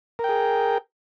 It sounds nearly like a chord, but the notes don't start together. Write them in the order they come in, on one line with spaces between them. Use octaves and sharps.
A#4 G5 G#4